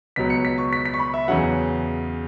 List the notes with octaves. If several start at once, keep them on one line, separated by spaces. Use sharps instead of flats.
C#2 B2 F#3 B6
C#7
B6
C#6
B6
B6
C#6
B5
E5
E2 C#3 F#3 F#5